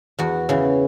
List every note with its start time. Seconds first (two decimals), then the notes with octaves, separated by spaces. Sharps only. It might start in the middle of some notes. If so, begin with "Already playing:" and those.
0.19 E2 F#4
0.49 C#3 E3